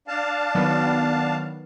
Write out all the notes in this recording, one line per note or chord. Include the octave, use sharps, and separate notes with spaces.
D4 F5 A5
D#3 F#3 B3